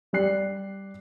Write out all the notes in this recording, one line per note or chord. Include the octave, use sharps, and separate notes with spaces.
G3 G4 D5 F#6 C7